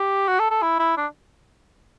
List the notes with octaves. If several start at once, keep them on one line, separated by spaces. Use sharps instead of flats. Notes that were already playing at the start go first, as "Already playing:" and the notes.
Already playing: G4
F#4
A4
A4
E4
E4
D4